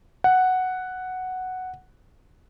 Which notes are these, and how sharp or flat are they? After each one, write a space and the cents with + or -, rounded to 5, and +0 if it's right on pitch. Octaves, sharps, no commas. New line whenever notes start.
F#5 +0